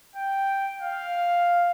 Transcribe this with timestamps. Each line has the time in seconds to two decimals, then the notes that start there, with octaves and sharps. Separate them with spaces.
0.15 G5
0.81 F5